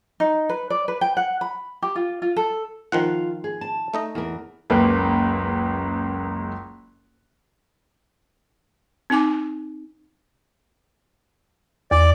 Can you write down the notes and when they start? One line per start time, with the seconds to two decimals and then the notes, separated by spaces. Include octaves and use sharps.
0.20 D#4
0.49 B4
0.70 D5
0.88 B4
1.01 G5
1.17 F#5
1.41 B5
1.82 G4
1.96 F4
2.22 F4
2.36 A4
2.92 D#3 F3 F4 F#5
3.44 G#4
3.61 A5
3.94 A3 D#4 D#5
4.15 E2 A#4
4.70 F#1 C#2 A#3 B4
9.10 C4 D#4 G#5 D6
11.91 E2 D5